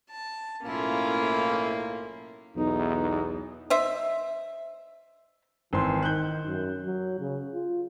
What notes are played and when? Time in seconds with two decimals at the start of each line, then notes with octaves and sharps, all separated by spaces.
0.11 A5
0.63 B1 A2 A#3 C#4 E4 F4
2.56 B1 E2 D#4
3.70 C5 D#5 E5
5.73 G#1 E3 C4 C6
6.03 D#3 F#6 G6
6.45 F#2
6.85 F#3
7.19 C#3
7.53 F4